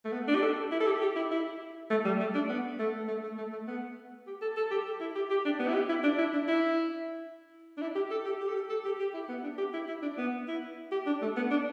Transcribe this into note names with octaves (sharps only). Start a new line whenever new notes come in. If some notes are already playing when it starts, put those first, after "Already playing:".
A3
B3
D4
G4
A4
E4
A4
G4
G4
E4
E4
A3
G3
A3
D4
B3
A3
A3
A3
A3
A3
B3
G4
A4
A4
G4
A4
E4
G4
G4
D4
B3
E4
G4
E4
D4
E4
D4
E4
D4
E4
G4
A4
G4
G4
A4
G4
A4
G4
G4
E4
B3
D4
G4
E4
E4
D4
B3
E4
G4
D4
A3
B3
D4